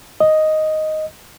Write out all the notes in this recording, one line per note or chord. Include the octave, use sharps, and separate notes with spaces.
D#5